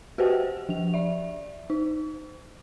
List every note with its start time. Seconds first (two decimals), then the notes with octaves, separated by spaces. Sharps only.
0.18 F#4 G4 B4 C5 F#5 G5
0.69 F3 F7
0.94 D5 E5
1.70 D#4